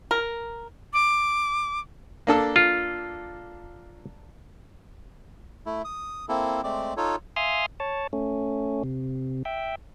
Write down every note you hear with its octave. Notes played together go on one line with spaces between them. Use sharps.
A#4
D6
A#3 D4 A4
F4
A3 E4
D#6
A#3 C4 E4 A4
G#3 A3 C4 D5 D6
D#4 F4 A4 C#5
E5 F5 G#5 C6 D#6 F6
C#5 A5
A3 C#4
C3
E5 G5